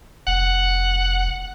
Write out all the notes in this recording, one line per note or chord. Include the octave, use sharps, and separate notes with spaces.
F1 F#5